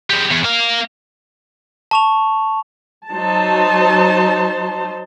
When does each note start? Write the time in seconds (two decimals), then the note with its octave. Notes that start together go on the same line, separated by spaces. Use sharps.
0.10 G#3 G4
0.31 E2
0.43 A#3 F5
1.91 A5 C#6 F7
3.09 F#3 D#4 C5 A5